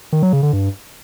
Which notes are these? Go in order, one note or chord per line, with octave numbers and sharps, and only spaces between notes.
D#3
F#3
C#3
D3
G2